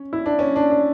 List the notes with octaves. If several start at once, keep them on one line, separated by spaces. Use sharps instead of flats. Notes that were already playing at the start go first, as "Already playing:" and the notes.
Already playing: C#4
E4
D4
C#4
D4
D4